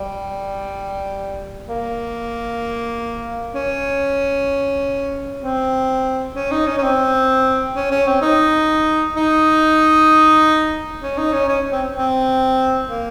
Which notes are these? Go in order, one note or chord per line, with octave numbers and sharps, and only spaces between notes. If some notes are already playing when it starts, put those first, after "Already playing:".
Already playing: G3
A#3
C#4
C4
C#4
D#4
C#4
C#4
C4
C#4
C#4
C4
D#4
D#4
C#4
D#4
C#4
C#4
C4
C4
A#3